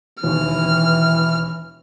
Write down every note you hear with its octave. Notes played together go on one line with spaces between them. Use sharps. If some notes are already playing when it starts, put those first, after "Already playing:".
E1 D#2 E3 F6